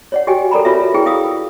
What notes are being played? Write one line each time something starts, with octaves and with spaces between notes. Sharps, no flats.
C#5 D5 F#5
F#4 G4 D#5 G5 G#5
A4 A#4 D5 A#5 B5
F4 F#4 B4 C#5 E5
E4 G#4 B4 G5
E4 F5 D#6 E6